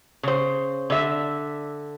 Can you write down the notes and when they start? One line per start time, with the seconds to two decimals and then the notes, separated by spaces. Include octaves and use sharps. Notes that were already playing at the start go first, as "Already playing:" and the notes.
0.23 C#3 C5
0.90 D3 E5